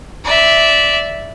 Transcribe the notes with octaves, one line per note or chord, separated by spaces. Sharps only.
D5 E5